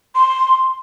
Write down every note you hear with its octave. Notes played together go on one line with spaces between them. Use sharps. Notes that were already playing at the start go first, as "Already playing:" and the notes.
C6